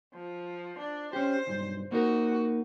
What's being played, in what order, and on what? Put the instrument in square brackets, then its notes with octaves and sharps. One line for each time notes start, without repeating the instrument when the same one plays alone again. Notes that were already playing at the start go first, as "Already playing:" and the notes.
[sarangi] F3
D4
[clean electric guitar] C#4 G4 [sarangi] C5
[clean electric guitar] B1 G2
[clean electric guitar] A#3 D#4 A#4 [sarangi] F#4